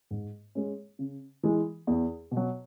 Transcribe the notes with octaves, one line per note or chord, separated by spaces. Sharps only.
G#2
G#3 C#4
C#3
E3 G#3
E2
B2
F#3